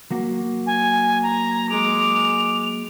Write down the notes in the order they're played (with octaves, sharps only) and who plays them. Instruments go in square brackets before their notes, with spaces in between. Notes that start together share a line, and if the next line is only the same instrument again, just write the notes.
[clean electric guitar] F#3 A#3 F#4
[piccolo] G#5
A#5
[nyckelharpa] G#3 D6 [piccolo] F7